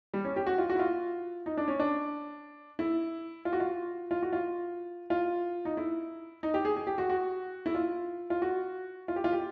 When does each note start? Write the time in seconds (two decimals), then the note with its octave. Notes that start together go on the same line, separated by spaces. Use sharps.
0.14 G3
0.25 C#4
0.36 G4
0.46 F#4
0.58 F4
0.70 F#4
0.75 E4
0.79 F4
1.46 D#4
1.57 D4
1.68 C#4
1.80 D4
2.79 E4
3.45 F4
3.53 F#4
3.60 F4
4.11 F4
4.23 F#4
4.33 F4
5.10 F4
5.65 D#4
5.77 E4
6.43 D#4
6.54 G4
6.65 G#4
6.77 G#4
6.87 G4
6.98 F#4
7.10 F#4
7.66 E4
7.75 F4
8.30 F4
8.42 F#4
9.08 F4
9.16 G4
9.24 F4
9.32 G4